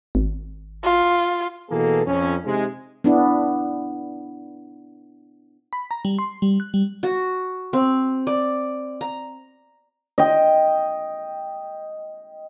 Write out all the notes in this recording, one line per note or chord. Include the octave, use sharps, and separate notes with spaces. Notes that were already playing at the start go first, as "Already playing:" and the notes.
G#1
F4
B2 E3 A#3 G#4 A4
F2 C#4
C3 G#3 D#4
B3 D4 E4
B5
A#5
G3
C6
G3
F#6
G3
F#4
C4
D5
A#5
D#5 G5